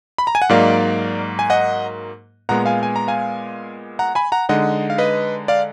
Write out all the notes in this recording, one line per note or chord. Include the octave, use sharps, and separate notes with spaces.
B5
A#5
G#5
F#5
G#2 F#3 A#3 D#4 D5 F5
G#5
D#5 F#5
A#2 G#3 B3 F#5 A#5
F5 G#5
G#5
A#5
F5 G#5
F#5 A#5
G#5 B5
F#5 A#5
D3 G#3 D#4 D#5 F#5
F5
B4 D#5
D5 F5